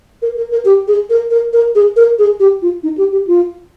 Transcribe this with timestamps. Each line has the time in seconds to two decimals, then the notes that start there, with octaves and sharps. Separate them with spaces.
0.22 A#4
0.37 A#4
0.51 A#4
0.65 G4
0.88 G#4
1.10 A#4
1.31 A#4
1.53 A#4
1.75 G#4
1.97 A#4
2.19 G#4
2.40 G4
2.62 F4
2.83 D#4
2.98 G4
3.12 G4
3.27 F4